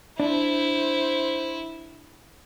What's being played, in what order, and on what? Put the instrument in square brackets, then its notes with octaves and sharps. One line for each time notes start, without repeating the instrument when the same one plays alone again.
[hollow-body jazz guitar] D4 [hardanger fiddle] E4 [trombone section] C5